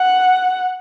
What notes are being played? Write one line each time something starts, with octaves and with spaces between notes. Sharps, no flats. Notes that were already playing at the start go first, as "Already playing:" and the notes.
Already playing: F#5